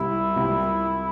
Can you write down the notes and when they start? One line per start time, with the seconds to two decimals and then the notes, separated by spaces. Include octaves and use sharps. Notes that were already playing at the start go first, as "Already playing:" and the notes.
Already playing: C2 C3 G3 E4
0.36 C2 C3 G3